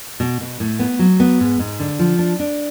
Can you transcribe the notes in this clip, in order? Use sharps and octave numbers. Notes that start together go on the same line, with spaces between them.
B2
B2
A2
B3
F#3
B3
G#2
G#2
D3
F3
D4
D4